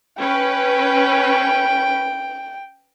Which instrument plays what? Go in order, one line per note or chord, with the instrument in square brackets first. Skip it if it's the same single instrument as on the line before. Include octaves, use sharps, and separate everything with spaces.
[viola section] C#4 B4 [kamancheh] G5